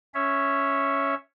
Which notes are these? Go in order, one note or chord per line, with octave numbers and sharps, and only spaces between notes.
C#4 C#5 E5